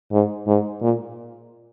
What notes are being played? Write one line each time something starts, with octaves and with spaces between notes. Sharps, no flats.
G#2
G#2
A#2